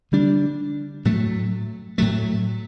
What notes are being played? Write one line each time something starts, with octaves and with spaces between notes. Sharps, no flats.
D3 G3 D4
A2 F#3 A3
A2 F#3 A3